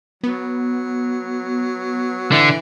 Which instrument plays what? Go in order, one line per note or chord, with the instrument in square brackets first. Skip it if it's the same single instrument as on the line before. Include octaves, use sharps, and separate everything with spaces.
[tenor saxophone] F#3 [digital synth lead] B3
[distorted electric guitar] D3 [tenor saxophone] E3